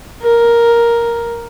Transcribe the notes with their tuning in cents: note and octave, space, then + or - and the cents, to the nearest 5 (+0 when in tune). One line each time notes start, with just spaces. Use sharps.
A#4 +5